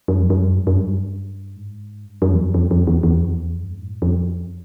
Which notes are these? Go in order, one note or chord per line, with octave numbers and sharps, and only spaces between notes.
F#2
F2
F#2
G2
F#2
G2
G#2
G2
F#2
E2
F2
F2
F2
E2
E2
F2
E2
F2
G2
F#2
G#2
A2
F2